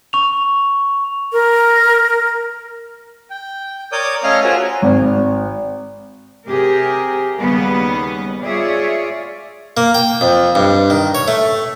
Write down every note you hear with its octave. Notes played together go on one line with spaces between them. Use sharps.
C#6 F7
A#4
G5
A#4 C#5 D5 D6 D#6 G6
A3 C#4 C#5 D#5 F5 F6
C#4 F4 F#4 G#4 A#4 C5
G#1
C3 G4 G#4 A#4
D#2 C#3 G3 B3
F4 G#4 C#5 D5 E5
A#3
G5
F2
G2
D#3
C#5
A3